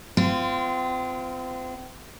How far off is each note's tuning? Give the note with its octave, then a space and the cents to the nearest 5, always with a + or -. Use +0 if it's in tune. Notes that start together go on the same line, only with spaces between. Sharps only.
C4 -35 F4 -15